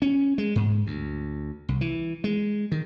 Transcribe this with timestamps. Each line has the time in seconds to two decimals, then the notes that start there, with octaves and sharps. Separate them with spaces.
0.02 C#4
0.38 G#3
0.56 G#2
0.87 D2
1.69 C2
1.81 E3
2.24 G#3
2.72 D#3